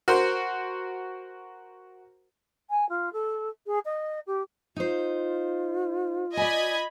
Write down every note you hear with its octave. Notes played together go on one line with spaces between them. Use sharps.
F#4 A#4 C5
G#5
F4
A4
G#4
D#5
G4
D#4 F4 C5
D5 D#5 G#5 B5 G#6